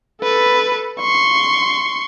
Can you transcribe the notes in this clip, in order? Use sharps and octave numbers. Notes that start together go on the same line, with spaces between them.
A4 B4
C6 C#6